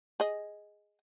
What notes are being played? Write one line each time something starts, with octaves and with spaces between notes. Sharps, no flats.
G#4 D#5